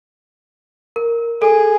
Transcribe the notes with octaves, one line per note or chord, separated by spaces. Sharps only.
A#4
G#4 A4